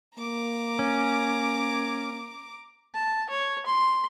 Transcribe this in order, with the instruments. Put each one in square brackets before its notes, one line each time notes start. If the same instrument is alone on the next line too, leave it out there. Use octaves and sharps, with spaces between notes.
[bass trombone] A#3 [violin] A#5 D6
[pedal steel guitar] C#4
[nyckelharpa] A5
C#5
C6